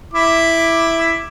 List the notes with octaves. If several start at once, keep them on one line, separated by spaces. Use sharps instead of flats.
E4 D6